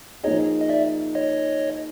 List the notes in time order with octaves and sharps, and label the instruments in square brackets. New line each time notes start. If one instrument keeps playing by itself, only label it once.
[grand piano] F3 A#3 D#4 G#4 [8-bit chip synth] C#5 D#5
[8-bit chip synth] D#5
D5 E5
C#5 D#5